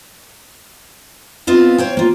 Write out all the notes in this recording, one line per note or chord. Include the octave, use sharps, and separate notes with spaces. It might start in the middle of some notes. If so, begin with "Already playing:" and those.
B3 C4 F4 D#5
C5 C#5 G5
A#3 F4